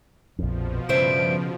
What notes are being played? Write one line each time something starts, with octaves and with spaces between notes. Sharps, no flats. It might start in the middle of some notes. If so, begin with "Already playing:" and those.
A#1 F2 B2 F3
G2 C#3 C5 E5 D7